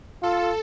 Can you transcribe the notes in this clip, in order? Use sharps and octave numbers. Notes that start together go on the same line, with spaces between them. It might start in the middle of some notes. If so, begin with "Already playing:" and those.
F4 A4